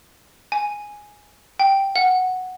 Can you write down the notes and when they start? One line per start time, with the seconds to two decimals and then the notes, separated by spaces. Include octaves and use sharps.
0.52 G#5
1.60 G5
1.96 F#5